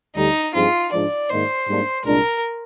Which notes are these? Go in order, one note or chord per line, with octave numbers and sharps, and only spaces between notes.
D2 D3 G3 D#4
G2 F3 C4 D#4 F4 G#4
G#2 F3 G#3 D4 D5
G#2 D#3 A#3 D#4 C5
G#2 G3 A#3 D4
C2 A#2 G#3 D4 A#4